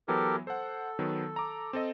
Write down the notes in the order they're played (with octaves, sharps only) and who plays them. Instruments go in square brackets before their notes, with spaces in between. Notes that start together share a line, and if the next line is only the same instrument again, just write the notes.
[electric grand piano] E3 F#3 B3 [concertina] G4 A4 A#4
[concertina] A4 [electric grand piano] C5 F#5
[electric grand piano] D#3 F#3 B3
A#5 D6
C4 A4 D#5